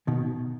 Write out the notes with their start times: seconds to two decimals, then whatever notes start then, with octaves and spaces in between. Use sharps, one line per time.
0.07 B2 D#3